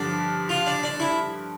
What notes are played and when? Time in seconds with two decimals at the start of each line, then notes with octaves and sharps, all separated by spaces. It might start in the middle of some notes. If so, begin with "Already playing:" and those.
Already playing: G2 D3 F3 D4
0.49 F4
0.66 D4
0.83 D4
1.00 E4